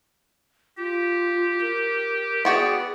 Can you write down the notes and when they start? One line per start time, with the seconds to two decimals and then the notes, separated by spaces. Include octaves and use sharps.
0.78 F4 G4
1.61 A#4
2.45 B3 F#4 G#4 D5 G5